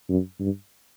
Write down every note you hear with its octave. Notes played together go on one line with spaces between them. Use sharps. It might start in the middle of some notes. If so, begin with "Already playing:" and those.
F#2
G2